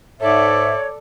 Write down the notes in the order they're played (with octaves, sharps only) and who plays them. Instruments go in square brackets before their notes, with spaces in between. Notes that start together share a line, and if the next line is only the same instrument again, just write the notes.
[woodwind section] G#2 E5 [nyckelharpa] A4 D5 [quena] C#5